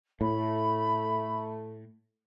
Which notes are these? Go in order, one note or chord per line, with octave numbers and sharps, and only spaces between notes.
A2 A3 B5